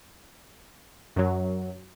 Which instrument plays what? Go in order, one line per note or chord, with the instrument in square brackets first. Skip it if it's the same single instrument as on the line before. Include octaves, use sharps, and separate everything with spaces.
[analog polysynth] F#2 F#3